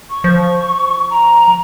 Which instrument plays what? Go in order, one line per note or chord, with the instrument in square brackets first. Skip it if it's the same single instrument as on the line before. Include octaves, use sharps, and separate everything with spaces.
[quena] C#6
[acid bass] F3
[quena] A#5